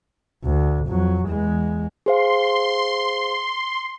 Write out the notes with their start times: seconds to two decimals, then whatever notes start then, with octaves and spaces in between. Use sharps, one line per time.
0.44 D2
0.87 F2 F#3
1.26 E2 G#3
2.06 G#4 C5 F5 C6